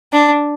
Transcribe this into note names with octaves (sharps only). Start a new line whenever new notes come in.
D4